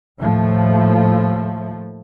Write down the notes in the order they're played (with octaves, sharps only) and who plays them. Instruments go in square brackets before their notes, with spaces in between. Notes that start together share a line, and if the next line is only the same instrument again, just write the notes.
[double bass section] D#2 A2 F3 A3